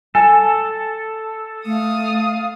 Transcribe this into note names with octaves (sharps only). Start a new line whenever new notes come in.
A4 G#5 A5
A3 F5 D#6